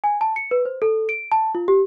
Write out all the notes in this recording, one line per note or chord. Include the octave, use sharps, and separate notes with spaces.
G#5
A5
C#7
B4
C5
A4
D7
A5
F4
G4